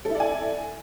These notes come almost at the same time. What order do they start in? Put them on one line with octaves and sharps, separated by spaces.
A4 E4 D5 G#5